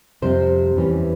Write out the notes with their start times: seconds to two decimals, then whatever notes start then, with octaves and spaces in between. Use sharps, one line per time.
0.22 F2 C3 G3 C4 C5
0.76 E2 E3 G3 C#4